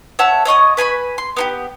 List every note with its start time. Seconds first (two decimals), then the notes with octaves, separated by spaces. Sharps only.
0.19 C#5 E5 F#5 A5
0.45 C#5 D#5 C#6 D#6
0.77 B4 G#5 A#5 B5
1.18 C6
1.36 B3 D#4 G4